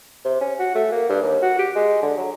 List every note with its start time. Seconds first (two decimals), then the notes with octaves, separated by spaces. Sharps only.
0.25 C3
0.41 C#4
0.59 F#4
0.75 A3
0.91 A#3
1.09 G2
1.22 D#2
1.42 F#4
1.58 G4
1.75 G#3
2.02 D3
2.17 F#3